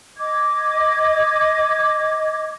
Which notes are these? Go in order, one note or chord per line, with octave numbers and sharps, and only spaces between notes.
D#5 D6 G#6